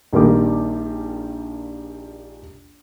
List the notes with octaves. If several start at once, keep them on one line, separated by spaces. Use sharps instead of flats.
A#1 D#3 G3 A#3 G4 D6